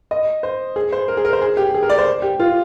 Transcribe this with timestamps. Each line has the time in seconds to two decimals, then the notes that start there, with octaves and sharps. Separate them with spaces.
0.11 D#5
0.43 C5
0.76 G#4
0.93 C5
1.08 A#4
1.17 G#4
1.25 A#4
1.33 C5
1.42 G#4
1.57 G4
1.74 G#4
1.83 A#4
1.90 D5
1.98 C5
2.22 G4
2.39 F4